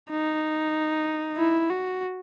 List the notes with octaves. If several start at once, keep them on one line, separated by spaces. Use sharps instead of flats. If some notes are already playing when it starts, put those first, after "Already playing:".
D#4
E4
F#4